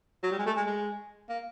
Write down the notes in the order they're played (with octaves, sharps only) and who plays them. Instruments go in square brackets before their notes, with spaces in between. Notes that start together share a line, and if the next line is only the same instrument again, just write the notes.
[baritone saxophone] F#3
G3
G#3
A3
G#3
G#3
A#3